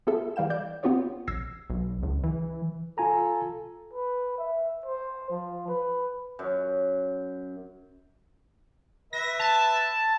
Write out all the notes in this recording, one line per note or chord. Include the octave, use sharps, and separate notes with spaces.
B3 F4 G#4 A4 E5
E3 G3 F5 G5 E7
D5 G6
B3 C4 F4 G4 C#5 D5
A#1 E6 G#6 A#6 C7
B1
C#2
E3
F4 A4 G#5 A#5
B4
E5
C5
F3
B4
F#2
B4 E5 A#6
A5